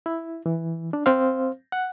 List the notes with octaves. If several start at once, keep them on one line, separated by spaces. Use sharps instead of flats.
E4
E3
D4
C4 C5 F5
F#5